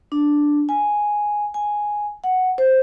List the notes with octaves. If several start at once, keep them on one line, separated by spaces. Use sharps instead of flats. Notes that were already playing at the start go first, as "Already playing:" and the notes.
D4
G#5
G#5
F#5
C5